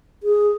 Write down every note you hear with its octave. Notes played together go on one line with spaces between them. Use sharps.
G#4